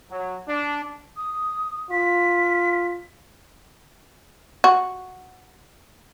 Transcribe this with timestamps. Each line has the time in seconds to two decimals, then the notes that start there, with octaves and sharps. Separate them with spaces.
0.10 F#3
0.47 D4
1.16 D#6
1.90 F4 B6
4.64 F#4